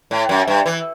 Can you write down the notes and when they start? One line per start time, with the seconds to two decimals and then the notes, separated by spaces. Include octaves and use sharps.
0.11 A2
0.29 F#2
0.48 G2
0.66 E3